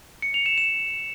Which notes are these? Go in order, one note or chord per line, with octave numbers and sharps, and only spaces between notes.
C#7
F7
E7
E7